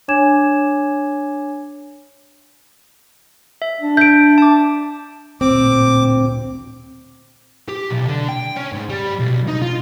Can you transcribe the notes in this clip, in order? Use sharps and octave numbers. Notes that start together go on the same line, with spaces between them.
D4 C#5 G#5 D6 G#6 E7
E5
D4
E5 G6 D7
A5 D6
A1 D2 A#2 C4 D6
G4
B1
D3
G5
C#4
G#2
G3
B1
D#4
F4